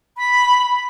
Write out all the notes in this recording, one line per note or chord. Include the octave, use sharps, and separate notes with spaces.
B5